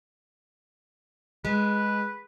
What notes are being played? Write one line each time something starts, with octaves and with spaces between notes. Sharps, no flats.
G#3 B4